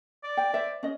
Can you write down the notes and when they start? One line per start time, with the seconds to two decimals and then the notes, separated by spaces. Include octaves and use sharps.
0.24 D5
0.37 G5
0.53 C5 E5
0.83 C#4 D#5